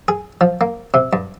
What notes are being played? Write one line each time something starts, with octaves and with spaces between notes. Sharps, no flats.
G#4
F3
A#3
C3
G2